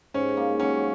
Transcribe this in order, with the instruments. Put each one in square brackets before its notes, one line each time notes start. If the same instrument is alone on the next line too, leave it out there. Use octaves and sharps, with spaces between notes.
[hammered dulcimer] G#2 [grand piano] C#4
[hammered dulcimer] A#3
[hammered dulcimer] F#3 [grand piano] C#4